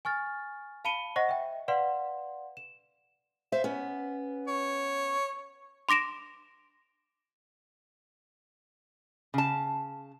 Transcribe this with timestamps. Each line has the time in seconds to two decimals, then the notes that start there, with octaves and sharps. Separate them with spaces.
0.05 G#5 C#6 F6 A6
0.85 F5 A5 B5 C#7 D#7 G7
1.16 C5 D#5 F#5 C#6 A#6
1.29 E5 G5
1.68 B4 D5 F5 F#5 C6
2.57 E7
3.52 C5 E5 F5
3.64 B3 C#4
4.48 C#5
5.89 C6 D6 A#6 D7 E7
9.34 C#3 A5